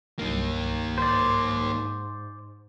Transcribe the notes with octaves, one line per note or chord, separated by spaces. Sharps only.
C2 G2 F#3 A#3 D#4
G#2 C5 D5